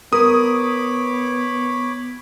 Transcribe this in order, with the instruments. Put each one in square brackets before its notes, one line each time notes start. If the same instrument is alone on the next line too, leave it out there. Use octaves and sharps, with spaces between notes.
[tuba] B3 [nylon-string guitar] A#4 [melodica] C#5 B5 D6 [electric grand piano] D#6